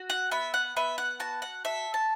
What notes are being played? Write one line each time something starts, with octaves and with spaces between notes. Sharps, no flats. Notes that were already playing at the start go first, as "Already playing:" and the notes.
Already playing: F#4
F#5
B3 E5
F#5
B3 E5
F#5
F#4 A5
F#5
A4 E5
A5